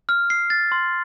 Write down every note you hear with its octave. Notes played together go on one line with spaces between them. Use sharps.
F6
C7
A6
C6